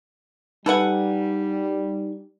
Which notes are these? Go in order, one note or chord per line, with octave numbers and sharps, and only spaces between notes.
G3 D#4 A4 B4 F#5 G#5